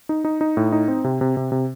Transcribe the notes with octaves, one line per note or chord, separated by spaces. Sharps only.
D#4
D#4
D#4
A2
D#4
C4
C3
C3
C3
C3